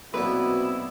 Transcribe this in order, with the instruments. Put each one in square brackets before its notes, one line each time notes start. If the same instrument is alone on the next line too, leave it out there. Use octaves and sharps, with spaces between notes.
[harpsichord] B1 A#2 B3 [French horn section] C4 F#4 [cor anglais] E4 [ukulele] B4